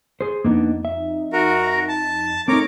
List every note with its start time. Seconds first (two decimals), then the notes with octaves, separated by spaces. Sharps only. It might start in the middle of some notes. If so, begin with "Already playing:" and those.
0.21 G#4 C5
0.44 F2 A#3 B3 D4 D#4
0.85 E5
1.33 F#4 A#4
1.88 A5
2.48 A3 C4 D#4 A#4 C#5 D6